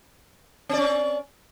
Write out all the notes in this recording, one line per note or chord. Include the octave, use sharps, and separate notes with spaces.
C4 C#4 D5